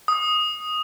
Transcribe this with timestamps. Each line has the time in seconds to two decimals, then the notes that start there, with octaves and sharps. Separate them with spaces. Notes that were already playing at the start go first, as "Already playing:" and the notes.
0.08 D#6